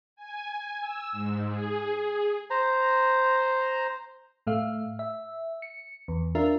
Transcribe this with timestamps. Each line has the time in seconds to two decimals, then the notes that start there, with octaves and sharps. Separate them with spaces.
0.16 G#5
0.81 E6
1.12 G#2
1.46 G#4
2.50 C5 A#5
4.47 A2 A3 F5
4.99 E5
5.62 C#7
6.08 E2
6.35 D4 F4 A#4 E5